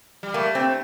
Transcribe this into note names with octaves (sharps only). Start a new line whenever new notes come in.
G3
A3 A#3
C4